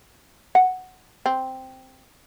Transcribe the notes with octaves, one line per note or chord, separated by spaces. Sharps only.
F#5
C4